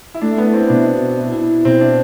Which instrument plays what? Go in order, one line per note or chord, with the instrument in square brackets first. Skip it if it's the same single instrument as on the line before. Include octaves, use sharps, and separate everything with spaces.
[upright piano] E4
[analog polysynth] A3 [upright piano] D4
[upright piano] B3
[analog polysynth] E4
[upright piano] C4
[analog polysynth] B2 [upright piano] D4
[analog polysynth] B2
E4
E4
[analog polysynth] B2 [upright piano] C4
[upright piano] D4